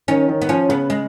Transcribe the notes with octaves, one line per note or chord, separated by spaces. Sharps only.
D#3 C#4
D#3
B3
F3 C#4
C#3 B3
G#3